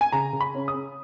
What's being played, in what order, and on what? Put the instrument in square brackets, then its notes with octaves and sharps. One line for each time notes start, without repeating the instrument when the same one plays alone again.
[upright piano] G#5
C#3 A#5
C#3
B5
C#4
D#6
C#4